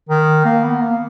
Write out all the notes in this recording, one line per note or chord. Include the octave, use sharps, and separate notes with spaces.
D#3
A#3
B3
A#3